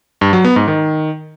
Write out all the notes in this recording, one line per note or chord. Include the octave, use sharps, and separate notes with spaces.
G2
F#3
B3
G#2
D#3